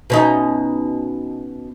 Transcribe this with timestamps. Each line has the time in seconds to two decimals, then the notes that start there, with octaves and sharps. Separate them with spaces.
0.10 B2 C#4 D#4